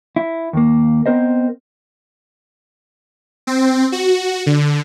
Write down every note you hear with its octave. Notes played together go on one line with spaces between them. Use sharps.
E4
D#2 A#3
B3 C4 A#4 C5 D#5
C4
F#4
D3